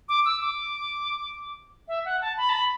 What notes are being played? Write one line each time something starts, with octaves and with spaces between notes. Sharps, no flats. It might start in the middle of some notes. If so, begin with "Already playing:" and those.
D6
E6
D6
E5
F#5
A5
B5
A5
B5